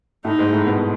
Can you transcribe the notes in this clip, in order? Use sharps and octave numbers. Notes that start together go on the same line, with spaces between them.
A2 A3 D#4
G#2 G#3
A2 A3
B2 B3